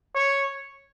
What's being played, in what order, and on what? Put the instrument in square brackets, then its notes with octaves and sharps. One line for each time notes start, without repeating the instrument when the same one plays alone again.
[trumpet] C#5